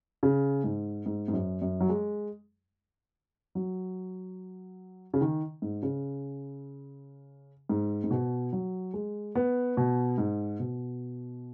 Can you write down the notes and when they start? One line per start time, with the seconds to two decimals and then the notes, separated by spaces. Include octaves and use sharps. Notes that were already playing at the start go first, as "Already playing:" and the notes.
0.23 C#3
0.64 G#2
1.06 G#2
1.28 G#2
1.33 F#2
1.62 F#2
1.80 F#3
1.89 G#3
3.55 F#3
5.14 C#3
5.21 D#3
5.62 G#2
5.82 C#3
7.69 G#2
8.04 G#2
8.11 B2
8.53 F#3
8.94 G#3
9.35 B3
9.77 B2
10.18 G#2
10.60 B2